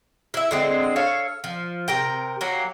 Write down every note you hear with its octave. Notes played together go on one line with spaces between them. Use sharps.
E4 E5
D3 G#3 C4
A4 C#5 F5
F3
C3 A#4 G5
F#3 A#3 G4